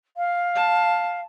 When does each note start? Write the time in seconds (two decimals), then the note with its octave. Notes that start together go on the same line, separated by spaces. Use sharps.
0.17 F5
0.55 A5